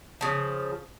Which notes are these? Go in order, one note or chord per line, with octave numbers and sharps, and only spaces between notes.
C#3 F3